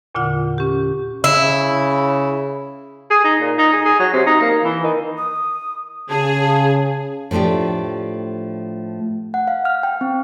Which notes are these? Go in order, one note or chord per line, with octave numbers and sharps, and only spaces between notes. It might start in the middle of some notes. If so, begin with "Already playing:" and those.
E2 A#2 D3 F4 F#5
C#4 G4
C#3 E4
G#4
D#4
A#2
D#4
G#4
G#4
F#3
C3
D#4
A#3
E3
D#3
D#6
C#3 G#4 A5
A2 F3 A3 D4 G4
F#5
F5
F6
G5
C4